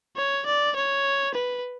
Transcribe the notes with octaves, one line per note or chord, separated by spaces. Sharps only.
C#5
D5
C#5
B4